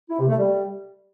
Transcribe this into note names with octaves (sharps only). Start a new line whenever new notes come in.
E4
C3
A3
G3